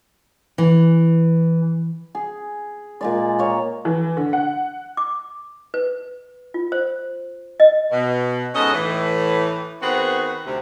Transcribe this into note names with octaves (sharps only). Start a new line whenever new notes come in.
E3
G#4
A#2 G#3 D5
A#3 C#5
E3
D3
F#5
D6
B4
F4
C5
D#5
B2
G#2 B3 C#4 A4 D#5
A2 E3
D#3 B3 C4 F#4 G#4 B4
D2 C3